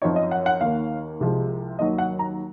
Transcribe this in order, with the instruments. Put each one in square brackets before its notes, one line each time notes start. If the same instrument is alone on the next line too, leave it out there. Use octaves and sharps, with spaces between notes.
[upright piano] F#2 F3 C4 D#4 C#5
D#5
F#5
F#5
D#2 D#3 A#3 F5
C2 C3 F3 G#3
D#2 D#3 F#3 D#5
F#5
A#5